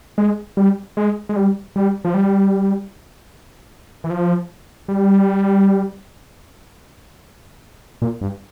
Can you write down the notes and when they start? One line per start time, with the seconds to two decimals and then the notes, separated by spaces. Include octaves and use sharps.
0.18 G#3
0.57 G3
0.97 G#3
1.29 G#3
1.36 G3
1.76 G3
2.05 F3
2.14 G3
4.04 E3
4.10 F3
4.88 G3
8.02 A#2
8.21 G2